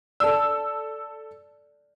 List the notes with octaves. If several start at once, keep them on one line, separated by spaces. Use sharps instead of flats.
A4 D5 A5 E6